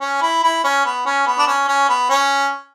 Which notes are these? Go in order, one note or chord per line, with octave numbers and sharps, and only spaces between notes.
C#4
E4
E4
C#4
B3
C#4
B3
D4
C#4
C#4
B3
C#4